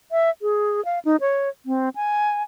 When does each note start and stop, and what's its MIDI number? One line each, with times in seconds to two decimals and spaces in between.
0.12 0.30 76
0.42 0.83 68
0.85 0.99 77
1.05 1.16 63
1.21 1.49 73
1.66 1.89 60
1.95 2.43 80